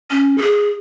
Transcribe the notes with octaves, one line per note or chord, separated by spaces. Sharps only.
C#4
A4
G#4